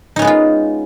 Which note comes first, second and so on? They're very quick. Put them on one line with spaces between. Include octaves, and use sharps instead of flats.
D#4 C#4 B3 G#3 F4